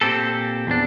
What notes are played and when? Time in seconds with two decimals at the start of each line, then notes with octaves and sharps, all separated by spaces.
0.01 A#2 C4 G4 A4
0.67 E2 D4